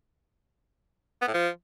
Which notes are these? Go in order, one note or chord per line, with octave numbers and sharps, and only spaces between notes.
B3
A2
F3